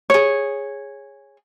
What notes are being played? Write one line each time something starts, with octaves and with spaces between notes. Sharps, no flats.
G#4 C#5